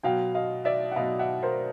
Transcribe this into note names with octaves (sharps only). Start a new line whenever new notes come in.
B2 F#3 F5 G5
D#5 F5
D5 E5
F#5
B2 F#3 D#5 F5
E5 F#5
A#4 C5